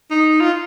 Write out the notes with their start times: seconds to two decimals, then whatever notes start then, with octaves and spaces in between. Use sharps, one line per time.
0.11 D#4
0.41 F4